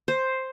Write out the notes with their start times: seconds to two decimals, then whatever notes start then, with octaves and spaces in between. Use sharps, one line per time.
0.08 C5